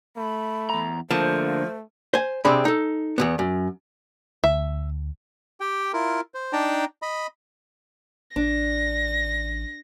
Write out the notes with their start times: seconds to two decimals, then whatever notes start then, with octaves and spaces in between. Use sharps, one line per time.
0.17 A3 B5
0.70 E2 A#5
1.11 D3 F3 A3 A#3 C5
2.14 C5 G#5
2.45 C3 C4 D4 G#4 B5
2.65 D#4 A4
3.18 E2 G#2 B3
3.39 F#2
4.44 D2 E5
5.60 G4 G5
5.93 E4 F4 A#4
6.34 C5
6.53 D4 D#4 D5 G5 A5 A#5
7.02 D#5 B5
8.36 A1 D4 A#6